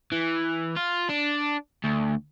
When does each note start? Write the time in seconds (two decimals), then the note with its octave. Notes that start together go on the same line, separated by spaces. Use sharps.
0.12 E3
0.77 F4
1.10 D4
1.84 D2